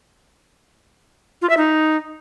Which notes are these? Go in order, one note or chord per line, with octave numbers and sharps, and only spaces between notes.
F4
E5
D#4